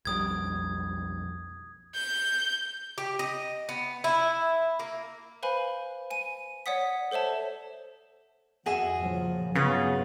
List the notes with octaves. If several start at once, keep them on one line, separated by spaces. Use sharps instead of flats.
B1 F2 G3 D#6 G#6
G6
G4
D#5
B3
E4
A#3
B4 C5 F5 G#5 B5
G#5 D#7
C#5 D5 F#5 D#6 B6
A4 C5 C#5 E5 A5
F2 F#4 G#4 E5
A#2 C#3 F3
G2 C#3 F#3 B3 F4 B4 D#6